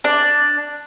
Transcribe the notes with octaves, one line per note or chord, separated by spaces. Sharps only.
D4 D5